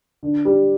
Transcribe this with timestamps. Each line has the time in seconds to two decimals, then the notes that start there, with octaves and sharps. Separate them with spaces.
0.23 D3
0.45 G3